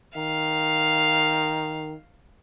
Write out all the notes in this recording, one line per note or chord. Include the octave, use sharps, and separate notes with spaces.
D#3 F5